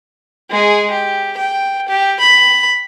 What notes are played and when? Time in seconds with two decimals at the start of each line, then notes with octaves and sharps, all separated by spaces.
0.50 G#3 G#4
0.91 G4
1.37 G5
1.89 G4
2.20 B5